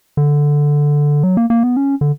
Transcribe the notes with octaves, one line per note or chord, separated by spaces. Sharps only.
D3
F#3
A#3
A#3
B3
C#4
D3